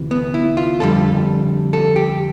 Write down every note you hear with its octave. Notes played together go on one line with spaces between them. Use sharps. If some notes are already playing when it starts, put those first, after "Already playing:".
Already playing: D2 C3 E3
B3
E4
F4
F2 D3 G3 A4
A4
G4